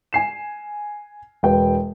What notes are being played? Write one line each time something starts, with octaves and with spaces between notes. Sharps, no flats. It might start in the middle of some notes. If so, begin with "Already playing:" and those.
G#5 C7 E7
E1 B4 G5